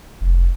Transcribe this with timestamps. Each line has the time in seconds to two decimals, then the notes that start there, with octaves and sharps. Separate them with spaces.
0.21 F1